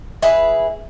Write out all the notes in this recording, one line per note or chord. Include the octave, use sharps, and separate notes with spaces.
E4 G#4 B4